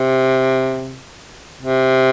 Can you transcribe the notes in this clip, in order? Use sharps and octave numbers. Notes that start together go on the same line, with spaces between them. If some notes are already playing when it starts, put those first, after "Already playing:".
Already playing: C3
C3